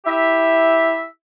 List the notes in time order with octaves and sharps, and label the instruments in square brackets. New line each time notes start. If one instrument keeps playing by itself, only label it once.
[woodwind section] E4 G4 E5